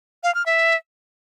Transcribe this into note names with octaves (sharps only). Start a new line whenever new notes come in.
F5
F6
E5